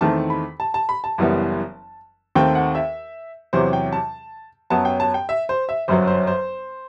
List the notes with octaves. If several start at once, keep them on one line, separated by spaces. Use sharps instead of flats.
E2 D#3 A3 C4 A5
B5
A5
A5
B5
A5
F#1 F#2 E3 G3 B3
D#2 D#3 A3 C4 G5
F#5
E5
E2 C3 F#3 C5
G5
A5
F#2 F#3 B3 A5
G5
A5
G5
E5
C5
E5
G1 F#2 F#3 C5
C5
C5